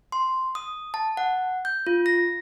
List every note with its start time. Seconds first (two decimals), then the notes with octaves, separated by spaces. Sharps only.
0.12 C6
0.55 D#6
0.94 A5
1.17 F#5
1.65 G6
1.87 F4
2.06 A#6